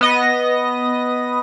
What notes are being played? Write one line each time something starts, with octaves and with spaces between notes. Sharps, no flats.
B3 D#5 A#6